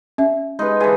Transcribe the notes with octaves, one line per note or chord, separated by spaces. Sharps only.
C#4 E5
G#3 D#4 B4
D3 E3 G#4